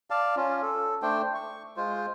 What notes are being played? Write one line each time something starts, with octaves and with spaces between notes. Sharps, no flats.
D5 F5 A5
C#4 F4
A4
A3 D4 C5 G5
C#6
G#3 F4 C5